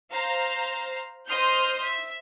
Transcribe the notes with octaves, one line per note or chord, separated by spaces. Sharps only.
C5 F5 A#5
C5 D#5 C6 D#6 F6 G6
E5